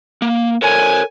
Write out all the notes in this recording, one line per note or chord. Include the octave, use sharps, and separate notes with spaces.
A#3
A4 A#4 C#5 G#5